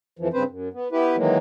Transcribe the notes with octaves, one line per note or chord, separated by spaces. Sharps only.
F2 E3 F3
G2 C#3 C4 B4 C5
F#2
B3
B3 E4 G4 B4
D#3 E3 F#3 G#3 A#3